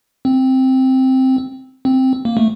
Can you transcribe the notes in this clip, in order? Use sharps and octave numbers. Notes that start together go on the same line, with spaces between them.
C4
C4
A#3
A3